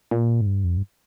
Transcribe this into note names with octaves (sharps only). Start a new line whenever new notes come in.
A#2
G#2
G2
F2
G2